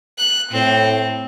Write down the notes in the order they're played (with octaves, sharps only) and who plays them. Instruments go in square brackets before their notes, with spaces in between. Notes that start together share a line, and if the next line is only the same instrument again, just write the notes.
[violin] F#6
[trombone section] A2 [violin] C4